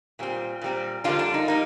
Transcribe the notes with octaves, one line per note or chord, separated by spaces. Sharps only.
A#2 G3 C4
A#2 G3 C4
F2 D3 G3 A#3 D4 F4
D4
D#4
G3 A#3 D#4